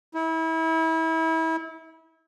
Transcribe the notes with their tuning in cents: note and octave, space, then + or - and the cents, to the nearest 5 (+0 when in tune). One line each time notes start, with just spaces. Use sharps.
E4 -30